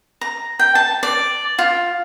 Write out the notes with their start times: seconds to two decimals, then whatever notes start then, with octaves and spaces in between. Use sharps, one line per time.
0.21 A#5
0.59 G5
0.75 A5
1.03 D5
1.59 F4